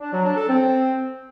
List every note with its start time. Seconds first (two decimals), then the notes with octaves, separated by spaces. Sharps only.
0.01 D4
0.13 F#3
0.24 D4
0.36 A4
0.48 C4